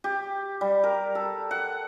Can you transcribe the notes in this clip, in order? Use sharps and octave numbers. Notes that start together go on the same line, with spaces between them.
G4
G3
A#4
A4
F#5